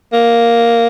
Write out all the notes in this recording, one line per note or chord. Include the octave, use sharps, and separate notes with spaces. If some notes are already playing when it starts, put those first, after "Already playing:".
A#3